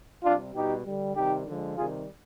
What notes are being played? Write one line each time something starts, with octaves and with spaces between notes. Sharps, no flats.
C3 G3 D4 F4
B2 G3 D#4 G4
D3 G3
C3 D#3 G3 D#4 G4
D3 F3 G#3
C3 D#3 G3 F4 G#4